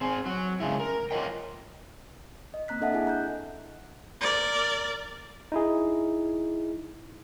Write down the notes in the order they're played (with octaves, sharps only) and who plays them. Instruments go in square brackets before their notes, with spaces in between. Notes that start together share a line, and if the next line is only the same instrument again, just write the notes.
[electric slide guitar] C4 G#4
F#3
C#3 G#3 A3 E4
A#4
F4 A#4 C#5 D#5 G5
[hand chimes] D#5
A#3 C4 A#5 F#6 B6
D4 A4 D#5 E5 F#5 A5
E4 G#4 D#5 G#5
A#5 F#6 G6
[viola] A#4 D5
[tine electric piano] D#4 E4 G#4